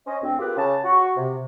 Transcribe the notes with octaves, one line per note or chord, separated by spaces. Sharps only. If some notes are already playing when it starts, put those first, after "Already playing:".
C#4 C5 D#5
D2 C4
F4 G4 G#4 A#4 B4
C#3 A5
F#4
C3